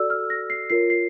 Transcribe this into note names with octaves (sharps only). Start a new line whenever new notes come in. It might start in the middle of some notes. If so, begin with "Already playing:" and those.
Already playing: F#4 A4 D5 E6
F6
A#6
C7
F4 A#4 C#5 C7
C7